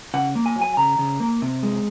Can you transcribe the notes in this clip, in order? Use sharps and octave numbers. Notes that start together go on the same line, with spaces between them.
C#3 F#5
A#3
G#5
F#3
G#5
C#3 A#5
C#3
A#3
C3
G#3